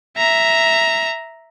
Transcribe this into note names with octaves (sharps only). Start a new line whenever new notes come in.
E5 A#5